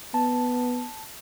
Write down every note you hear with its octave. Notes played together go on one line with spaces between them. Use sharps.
B3 A5